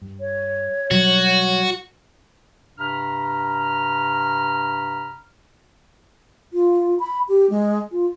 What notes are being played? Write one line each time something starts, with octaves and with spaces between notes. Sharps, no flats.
G2
C#5
B2 F#3 G3 F#4
G2 C3 A#5 B5 F6
F4
B5
G4
G#3
F4